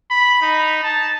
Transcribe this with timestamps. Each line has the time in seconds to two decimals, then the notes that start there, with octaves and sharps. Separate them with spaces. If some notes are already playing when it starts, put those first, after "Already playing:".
0.11 B5
0.42 D#4
0.84 A5